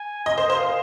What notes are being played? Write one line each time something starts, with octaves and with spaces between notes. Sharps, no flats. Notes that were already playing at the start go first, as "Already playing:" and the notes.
Already playing: G#5
D#5
C5 D#5
C5 F5